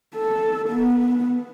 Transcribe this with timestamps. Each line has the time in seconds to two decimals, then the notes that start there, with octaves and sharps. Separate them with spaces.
0.15 A4
0.68 B3